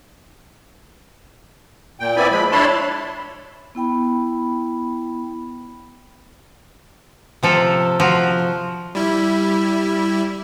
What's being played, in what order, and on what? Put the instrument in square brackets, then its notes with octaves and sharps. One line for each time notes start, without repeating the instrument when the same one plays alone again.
[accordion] A#2 G5
B3 C4 E4 D5 G#5 B5
F3 G#3 B5
D4 E4 C#5 A5 B5 C6
[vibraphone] B3 E4 G5 B5
[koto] C3 F3 A4
F3 F#4
[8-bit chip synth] G3 E4